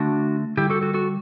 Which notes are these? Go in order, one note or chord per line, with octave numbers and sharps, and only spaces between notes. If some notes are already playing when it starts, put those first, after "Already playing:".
Already playing: D3 A3 D4 F#4
D3 G3 E4 G4
F#4 A4
F#4 A4
F#4 A4